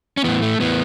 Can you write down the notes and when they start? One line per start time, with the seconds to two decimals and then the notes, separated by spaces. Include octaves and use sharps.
0.17 C#4
0.24 A2 E3 B3
0.42 A3
0.60 A2 E3 B3